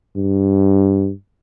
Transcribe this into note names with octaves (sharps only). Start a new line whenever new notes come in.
G2